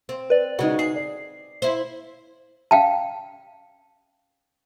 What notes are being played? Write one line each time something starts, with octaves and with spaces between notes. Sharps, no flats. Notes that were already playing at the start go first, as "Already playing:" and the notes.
C4
B4 D5
C#3 G#3 D#4 F#4
G#4 C7
D5
E4 C5
F5 G5 A5